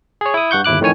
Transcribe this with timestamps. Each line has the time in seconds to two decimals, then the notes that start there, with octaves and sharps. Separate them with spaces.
0.21 G#4 C#5
0.34 E4 D#6
0.51 G2 F#5 C#6 G6
0.64 G1 D#2 E4 D6 F#6
0.81 F2 A2 D#3 E3 C#5 G#5